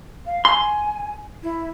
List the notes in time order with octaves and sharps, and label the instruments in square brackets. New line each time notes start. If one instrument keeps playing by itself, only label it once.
[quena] F5
[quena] G#5 [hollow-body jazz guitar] C6
[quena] E4